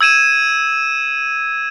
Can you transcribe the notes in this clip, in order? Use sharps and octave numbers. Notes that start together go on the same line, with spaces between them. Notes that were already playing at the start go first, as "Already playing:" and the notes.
E6 G#6 D#7 E7